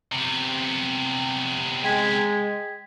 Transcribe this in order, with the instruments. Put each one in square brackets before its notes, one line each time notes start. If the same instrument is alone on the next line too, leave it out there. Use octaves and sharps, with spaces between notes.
[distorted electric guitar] C3 B3
[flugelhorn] G#3 [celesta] G5 G#6 B6